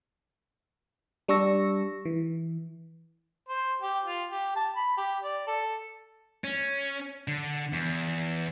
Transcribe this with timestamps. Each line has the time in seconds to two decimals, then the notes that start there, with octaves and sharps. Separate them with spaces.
1.28 G3 D4 C#6 E6 A#6
2.05 E3
3.49 C5
3.81 G4
4.05 F4
4.29 G4
4.56 A5
4.76 B5
4.98 G4
5.23 D5
5.47 A4
6.44 C#4
7.28 D3
7.73 E2